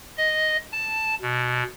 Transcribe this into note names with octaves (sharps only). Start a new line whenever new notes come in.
D#5
A5
B2